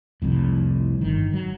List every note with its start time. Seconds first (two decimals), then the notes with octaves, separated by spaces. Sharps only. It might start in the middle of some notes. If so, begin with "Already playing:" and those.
0.22 C2 F2 A2
1.01 G1 D#3
1.33 F#3